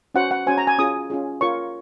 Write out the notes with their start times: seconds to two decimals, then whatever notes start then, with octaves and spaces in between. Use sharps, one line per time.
0.15 C#4 F#4 C5 F#5
0.31 F#5
0.47 C#4 F#4 C5 G#5
0.58 A#5
0.67 G#5
0.78 C#4 F4 G#4 D#6
1.10 C#4 F4 G#4
1.41 F4 A#4 C#5 C#6